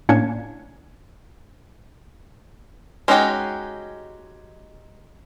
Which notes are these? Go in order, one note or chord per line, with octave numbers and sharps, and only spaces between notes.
A2 A#3 C#4 D4 G#6 C#7
G#3 C#4 D#4 F#4 G4